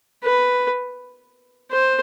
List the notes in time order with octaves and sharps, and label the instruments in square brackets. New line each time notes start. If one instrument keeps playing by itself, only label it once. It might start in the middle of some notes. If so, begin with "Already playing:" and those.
[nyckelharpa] B4
C5